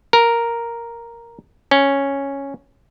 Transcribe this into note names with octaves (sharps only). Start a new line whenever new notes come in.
A#4
C#4